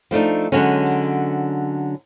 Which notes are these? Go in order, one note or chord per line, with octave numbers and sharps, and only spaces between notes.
F3 A3 D4 D#4
D3 F#3 G#3 C#4